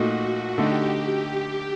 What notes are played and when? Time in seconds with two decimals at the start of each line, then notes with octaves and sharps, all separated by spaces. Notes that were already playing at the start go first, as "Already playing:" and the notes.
Already playing: A#2 A3 D#4 F#4
0.57 D3 A3 D#4 G4